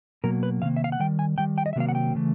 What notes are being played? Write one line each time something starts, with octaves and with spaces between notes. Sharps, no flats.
B2 F#3 A#3 A#4
B4
C3 D#3 A#3 F5
E5
F5
F#5
D#3 G3 G5
G#5
D#3 G3 G5
G5
D#5
E5
C3 D#3 F#3 A#3 F5
F#5
G5
C#3 E3 A3